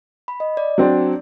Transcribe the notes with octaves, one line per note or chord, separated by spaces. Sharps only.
B5
D#5
D5
F#3 C4 D4